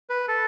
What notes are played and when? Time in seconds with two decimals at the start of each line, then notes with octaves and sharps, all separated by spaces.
0.10 B4
0.28 A4